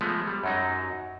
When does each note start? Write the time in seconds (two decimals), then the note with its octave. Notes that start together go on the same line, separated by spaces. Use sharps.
0.01 F3 G#3 A3 B3
0.27 G3
0.44 F#2 F#3 D#4